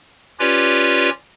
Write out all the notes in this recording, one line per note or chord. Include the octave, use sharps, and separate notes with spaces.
C#4 F4 G4 B4 C#5 D5